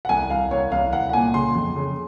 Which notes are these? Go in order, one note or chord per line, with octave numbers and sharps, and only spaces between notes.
F#5
C2 G#5
C2 F5
C2 C#5
C2 F5
C2 F#5
F#5
A#2 G#5
C#3 C6
F2
C#3